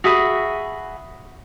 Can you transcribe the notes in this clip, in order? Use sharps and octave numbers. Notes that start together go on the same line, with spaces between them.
F#4 G#4 E5 B5